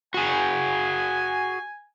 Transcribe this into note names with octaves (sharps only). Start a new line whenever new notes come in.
F#4 G#4 G#5